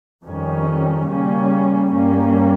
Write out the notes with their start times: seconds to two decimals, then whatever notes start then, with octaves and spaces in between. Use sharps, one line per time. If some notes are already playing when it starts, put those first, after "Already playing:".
0.24 F2 D#3 G3 C#4
1.08 C#3 G3 A#3 C#4
1.92 G2 G3 A#3 C#4